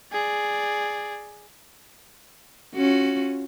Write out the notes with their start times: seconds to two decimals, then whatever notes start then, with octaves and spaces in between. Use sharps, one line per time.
0.12 G#4 D5
2.75 C#4 F4 F#4